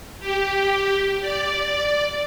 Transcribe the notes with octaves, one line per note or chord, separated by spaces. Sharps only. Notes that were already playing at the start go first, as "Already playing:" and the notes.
G4
D5